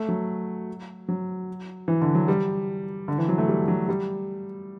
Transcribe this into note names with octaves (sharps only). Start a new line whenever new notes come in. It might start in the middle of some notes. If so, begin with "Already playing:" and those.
Already playing: A3
F#3
F#3
E3
D3
F#3
G3
D3
E3
F#3
A3
G3
F#3
G3